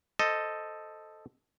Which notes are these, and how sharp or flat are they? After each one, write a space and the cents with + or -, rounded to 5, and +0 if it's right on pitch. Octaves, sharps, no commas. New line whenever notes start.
A4 +0 C5 +0 D#5 +0